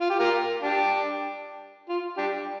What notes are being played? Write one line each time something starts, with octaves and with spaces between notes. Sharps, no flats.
F4
G4
F4 A#4
D4 G4
F4
D4 G4